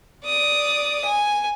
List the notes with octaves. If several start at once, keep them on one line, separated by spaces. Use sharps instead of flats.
D5 D#6
G#5